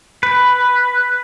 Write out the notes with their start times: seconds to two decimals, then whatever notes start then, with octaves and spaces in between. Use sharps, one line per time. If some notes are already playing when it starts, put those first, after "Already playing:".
0.23 B4